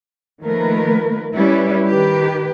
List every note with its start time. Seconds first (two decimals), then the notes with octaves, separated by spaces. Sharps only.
0.42 D#3 F3 A3 A#3 A#4 B4
1.35 G3 C#4 E4 B4
1.87 D#3 G4 B4